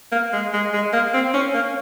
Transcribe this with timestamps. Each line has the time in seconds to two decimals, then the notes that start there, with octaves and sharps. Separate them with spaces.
0.12 A#3
0.33 G#3
0.53 G#3
0.74 G#3
0.93 A#3
1.13 C4
1.34 C#4
1.54 A#3